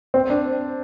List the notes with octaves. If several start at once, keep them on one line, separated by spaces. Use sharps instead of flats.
C4
D4